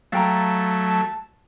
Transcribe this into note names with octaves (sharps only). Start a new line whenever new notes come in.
F#3 A3 F5 G5 A5 A#5